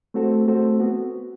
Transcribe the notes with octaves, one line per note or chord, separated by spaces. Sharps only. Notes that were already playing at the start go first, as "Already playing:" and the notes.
A3 C4 F#4 A4 C5
A3 C4 F#4 A4 C5
B3 F#4